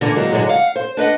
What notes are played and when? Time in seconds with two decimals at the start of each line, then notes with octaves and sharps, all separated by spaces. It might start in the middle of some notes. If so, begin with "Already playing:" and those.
0.01 D3 E3 A#3
0.16 F#3 G#3 A#3 C4
0.32 G#2 D3 F#3 G#3
0.49 F5 F#5
0.76 C5
0.97 D4 B4 D#5 F#5